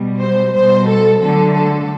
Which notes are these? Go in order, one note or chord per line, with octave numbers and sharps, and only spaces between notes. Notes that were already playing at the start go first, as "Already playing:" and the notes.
Already playing: B2 G3
C5
B2 G3 C5
A4
D3 F#3 A3 A4
A4